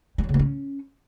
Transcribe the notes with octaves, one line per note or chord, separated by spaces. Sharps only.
G3
F#3
C#3
A#3
C#4